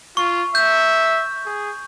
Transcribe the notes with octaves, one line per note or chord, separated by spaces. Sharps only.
F4 C#6
E5 G6
G#4